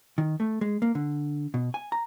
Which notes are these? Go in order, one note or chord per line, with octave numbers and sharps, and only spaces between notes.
D#3
A3
G#3
A#3
D3
B2
G#5
A#5